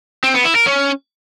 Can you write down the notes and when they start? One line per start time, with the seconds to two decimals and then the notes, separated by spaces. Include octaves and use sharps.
0.24 C4
0.34 B3
0.45 E4
0.56 A#4
0.67 C#4